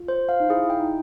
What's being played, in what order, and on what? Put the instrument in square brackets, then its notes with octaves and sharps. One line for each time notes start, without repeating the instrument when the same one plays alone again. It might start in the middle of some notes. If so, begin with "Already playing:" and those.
Already playing: [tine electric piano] F4
[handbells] C5
F5
[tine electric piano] D#4
[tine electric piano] E4 [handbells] G#4
[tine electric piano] E4
[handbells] G5
[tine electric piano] D#4